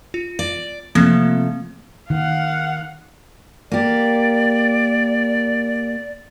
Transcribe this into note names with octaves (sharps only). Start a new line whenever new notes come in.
F4
D5
C3 F3 A3 A#3 C4
D#3 F5 F#5
A#3 G4 D5